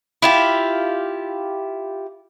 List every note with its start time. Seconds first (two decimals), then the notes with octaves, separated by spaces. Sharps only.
0.22 E4 F4 G4